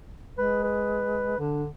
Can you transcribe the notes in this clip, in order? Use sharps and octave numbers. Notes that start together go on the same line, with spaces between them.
G#3 B4
B4
D3 D4